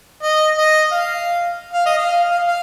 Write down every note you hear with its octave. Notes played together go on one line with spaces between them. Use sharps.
D#5
D#5
F5
F5
D#5
F5
F5
F5